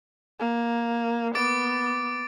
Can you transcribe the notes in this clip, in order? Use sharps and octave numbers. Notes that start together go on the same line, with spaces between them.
A#3
B3 D6 A6 D7